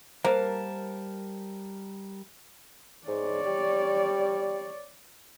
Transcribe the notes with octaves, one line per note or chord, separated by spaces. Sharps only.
G3 A#3 A#4 C5 A5
G#2 C#5 D5
G3